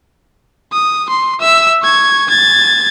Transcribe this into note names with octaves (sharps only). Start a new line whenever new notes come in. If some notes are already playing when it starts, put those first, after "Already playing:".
D#6
C6
E5 E6
C#6 G#6
G#6 A6